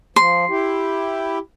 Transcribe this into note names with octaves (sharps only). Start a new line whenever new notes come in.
F3 C6
E4 G4